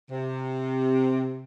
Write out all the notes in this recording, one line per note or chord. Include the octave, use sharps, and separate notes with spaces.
C3